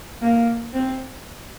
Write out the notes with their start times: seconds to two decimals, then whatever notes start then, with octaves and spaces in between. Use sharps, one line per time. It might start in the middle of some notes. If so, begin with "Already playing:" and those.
0.21 A#3
0.73 C4